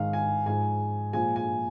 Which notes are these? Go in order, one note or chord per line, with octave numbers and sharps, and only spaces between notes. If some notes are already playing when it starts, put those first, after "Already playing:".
Already playing: G#2 D#3 G#3 F5
G#5
G#2 F3 G#3 G#5
A#2 F3 G#3 G#5
G#5